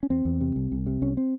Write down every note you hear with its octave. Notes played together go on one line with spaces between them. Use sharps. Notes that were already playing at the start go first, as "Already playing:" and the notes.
C#4
E2 C4
E2
C3
C2
C2
C3
C2 C#4
C4